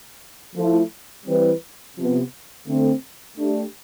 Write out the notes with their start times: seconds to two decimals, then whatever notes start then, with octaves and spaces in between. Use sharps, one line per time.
0.55 F3 A3 E4 A4
1.26 E3 G3 C4 E4 B4
1.96 C3 F3 B3
2.66 D3 A3 C4
3.37 A3 D4 G4